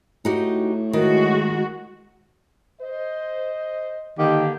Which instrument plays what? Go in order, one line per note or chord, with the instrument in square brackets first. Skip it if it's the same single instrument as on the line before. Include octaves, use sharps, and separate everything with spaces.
[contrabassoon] A2 [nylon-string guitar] D#4 F#4 G4
[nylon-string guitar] D#3 [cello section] G#3 F#4
[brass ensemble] C5 D#5
[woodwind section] D3 A#3 G4 [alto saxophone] D#3